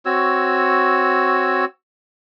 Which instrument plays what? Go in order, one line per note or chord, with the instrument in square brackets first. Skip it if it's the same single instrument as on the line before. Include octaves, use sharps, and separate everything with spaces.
[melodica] C4 F#4 C#5 E6